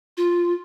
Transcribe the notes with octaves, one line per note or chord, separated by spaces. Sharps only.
F4